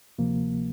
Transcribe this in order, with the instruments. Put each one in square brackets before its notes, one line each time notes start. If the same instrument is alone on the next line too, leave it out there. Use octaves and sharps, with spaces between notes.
[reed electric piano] D2 C3 F3 A#3